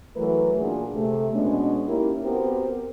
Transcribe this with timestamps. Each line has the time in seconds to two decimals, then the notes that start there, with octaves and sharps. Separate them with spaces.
0.16 E3 F#3 A3 A#4 B4
0.58 A#2 D4 F#4 G#4
0.93 C3 A3
1.32 B2 G#3 B3 C#4 D4
1.87 A#3 C#4 D#4 E4 G4 A#4
2.25 B3 C4 F#4 G4 A#4 C5